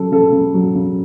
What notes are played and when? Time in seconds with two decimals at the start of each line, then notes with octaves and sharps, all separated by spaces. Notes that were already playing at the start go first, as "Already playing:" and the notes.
Already playing: C#3 F#3 A4
0.12 C#3 A4
0.32 C#3
0.54 F#3
0.75 C#3